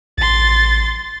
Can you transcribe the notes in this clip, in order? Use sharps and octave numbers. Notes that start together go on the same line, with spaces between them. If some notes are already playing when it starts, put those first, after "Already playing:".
A1 C6 A6